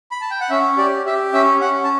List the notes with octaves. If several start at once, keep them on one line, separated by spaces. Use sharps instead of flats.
B5
A5
G5
F#5
C#4 E5
G4 D5
G4 E5
C#4 E5
C#4 F#5
A5